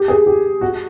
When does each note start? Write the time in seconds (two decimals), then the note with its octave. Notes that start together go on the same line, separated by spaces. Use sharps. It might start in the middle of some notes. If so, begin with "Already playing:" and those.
Already playing: G4
0.08 G#4
0.26 G4
0.61 F#4